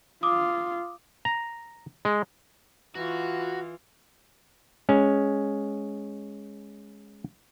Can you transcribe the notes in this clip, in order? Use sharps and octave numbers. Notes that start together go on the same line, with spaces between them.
F4 D6 D#6
A#5
G#3
E3 F4 F#4
G#3 C#4